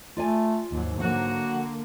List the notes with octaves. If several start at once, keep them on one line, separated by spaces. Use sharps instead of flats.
A3 F4 D5 G#5
D#2 G#2 F#3
D3 F#3 A#3 F#4 F#5